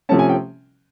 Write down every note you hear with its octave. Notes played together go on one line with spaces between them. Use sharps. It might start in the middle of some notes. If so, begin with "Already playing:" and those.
C3 F3 A3 C#4 A5
G#5
G5